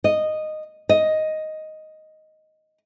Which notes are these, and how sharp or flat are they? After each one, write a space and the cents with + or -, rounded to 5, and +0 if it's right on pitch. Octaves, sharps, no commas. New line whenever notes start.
D#5 -10
D#5 +5